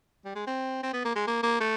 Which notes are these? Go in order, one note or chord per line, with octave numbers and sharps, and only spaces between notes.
G3
G#3
C4
C4
B3
A#3
G#3
A#3
A#3
A3